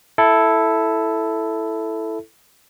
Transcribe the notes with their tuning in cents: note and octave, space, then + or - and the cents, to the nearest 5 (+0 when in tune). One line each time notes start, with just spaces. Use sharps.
E4 +0 A4 +0